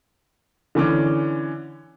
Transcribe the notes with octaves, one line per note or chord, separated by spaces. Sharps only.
D3 E3 C#4 D6